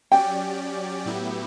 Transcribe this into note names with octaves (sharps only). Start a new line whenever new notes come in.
F#3 C#4 G4 D5 G5
A2 F#3 B3 E4 G4